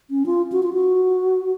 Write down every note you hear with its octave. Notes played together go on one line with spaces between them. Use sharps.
C#4
F4
F#4
F4
F#4